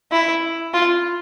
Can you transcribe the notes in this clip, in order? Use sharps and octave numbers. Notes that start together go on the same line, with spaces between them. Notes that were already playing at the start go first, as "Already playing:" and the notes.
E4
F4